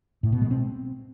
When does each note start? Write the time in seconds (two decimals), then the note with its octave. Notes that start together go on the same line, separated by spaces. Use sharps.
0.23 A2
0.32 B2
0.42 G#3
0.51 C4